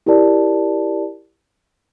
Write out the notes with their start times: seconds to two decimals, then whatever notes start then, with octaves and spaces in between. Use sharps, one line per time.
0.06 E4 G4 A#4 D5 A5